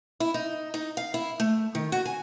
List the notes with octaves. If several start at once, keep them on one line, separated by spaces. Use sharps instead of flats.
E4
D#4
D#4
F5
E4
A3
D#3
F#4
G#5